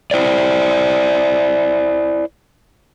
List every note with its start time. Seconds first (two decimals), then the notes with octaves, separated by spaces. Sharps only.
0.11 E4 C5 D5